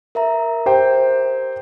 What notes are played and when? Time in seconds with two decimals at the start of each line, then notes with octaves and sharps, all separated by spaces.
0.15 A#4 E5 A#5
0.66 G4 C5 G5